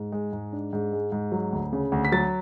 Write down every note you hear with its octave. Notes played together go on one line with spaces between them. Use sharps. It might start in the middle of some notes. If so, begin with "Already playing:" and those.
Already playing: G#2
G#3
G#2
D4
G#2
G#3
G#2
F#3
D2
C#3
D2
B6
F#3 A6